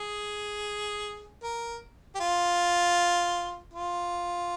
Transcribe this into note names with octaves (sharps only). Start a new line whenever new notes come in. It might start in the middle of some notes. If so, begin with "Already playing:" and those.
Already playing: G#4
A#4
G4
F4
F4